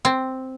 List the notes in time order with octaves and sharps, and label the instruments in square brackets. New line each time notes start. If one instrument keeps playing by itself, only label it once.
[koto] C4